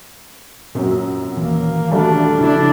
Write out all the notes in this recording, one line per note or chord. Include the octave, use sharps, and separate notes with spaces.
F#2 A#2 F#3 C4
D#1 E3 A#3
G3 A3 D4 F#4
C#3 F3 D4 E4